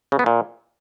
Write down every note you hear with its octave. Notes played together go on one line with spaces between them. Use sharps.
C#3
B3
A#2